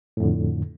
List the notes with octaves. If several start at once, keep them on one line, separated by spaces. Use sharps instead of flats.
F2 A2 D3